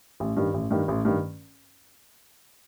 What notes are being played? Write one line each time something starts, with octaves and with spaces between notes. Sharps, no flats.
A1
G2 D#3
A1
G2 D#3
A1
G2 D#3